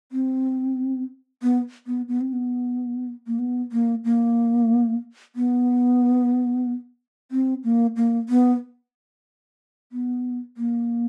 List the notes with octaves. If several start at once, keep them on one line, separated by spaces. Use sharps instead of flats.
C4
B3
B3
B3
C4
B3
A#3
B3
A#3
A#3
B3
C4
A#3
A#3
B3
B3
A#3